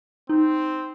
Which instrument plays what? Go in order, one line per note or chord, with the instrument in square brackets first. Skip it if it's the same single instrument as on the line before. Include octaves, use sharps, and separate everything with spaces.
[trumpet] C4 [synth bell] D#4